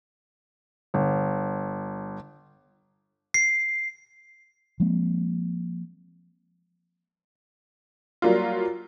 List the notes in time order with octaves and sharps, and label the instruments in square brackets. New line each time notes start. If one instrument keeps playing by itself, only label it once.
[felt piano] G1
[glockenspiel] C7
[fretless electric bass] F3 G#3 A#3 C4
[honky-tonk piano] F#3 G3 A#3 F4